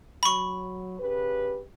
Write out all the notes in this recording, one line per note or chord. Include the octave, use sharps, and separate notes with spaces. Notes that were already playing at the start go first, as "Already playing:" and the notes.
F#3 B5 C#6
C#3 G4 B4